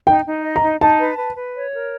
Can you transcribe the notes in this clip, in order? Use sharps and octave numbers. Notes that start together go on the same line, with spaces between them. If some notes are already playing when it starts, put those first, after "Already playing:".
D#4 G5
D#4
D#5
A#5
D#4
D#4 A5
B4
B4
B4
C#5
A#4